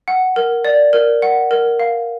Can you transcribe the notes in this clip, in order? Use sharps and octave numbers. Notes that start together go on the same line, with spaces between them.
F#5
A#4
D5
A#4
F#5
A#4
F5